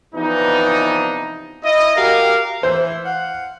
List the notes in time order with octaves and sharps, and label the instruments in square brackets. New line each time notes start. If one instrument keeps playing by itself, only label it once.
[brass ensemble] C3 E3 F3 B3 D4 D#4
E4 D#5
F#4 G4 A#4 F5
[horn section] E3 [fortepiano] C5
[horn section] F5 F#5